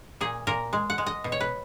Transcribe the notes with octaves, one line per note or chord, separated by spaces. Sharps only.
A#2 G#4
A#2 A#4
G#3
F#5
G#3
D#5
B2
C#5
B4